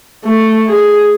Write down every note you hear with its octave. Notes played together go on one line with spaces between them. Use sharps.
A3
G#4